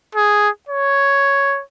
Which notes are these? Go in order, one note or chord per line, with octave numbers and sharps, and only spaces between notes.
G#4
C#5